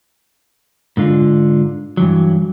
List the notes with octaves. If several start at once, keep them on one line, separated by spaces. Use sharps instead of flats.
G#2 D3 F4
G2 E3 F#3